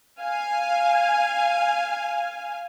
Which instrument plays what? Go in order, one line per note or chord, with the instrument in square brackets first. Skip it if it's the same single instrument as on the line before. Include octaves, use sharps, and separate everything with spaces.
[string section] F5 G#5